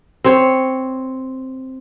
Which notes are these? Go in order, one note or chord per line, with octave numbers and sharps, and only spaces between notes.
C4 C#5